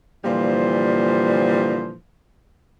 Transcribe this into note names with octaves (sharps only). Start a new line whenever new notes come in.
A#2 D3 E3 F3 G3 C5